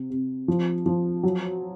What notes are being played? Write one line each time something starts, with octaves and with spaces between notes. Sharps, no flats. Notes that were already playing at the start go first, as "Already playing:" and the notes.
Already playing: C3
C3
F3
F3
F#3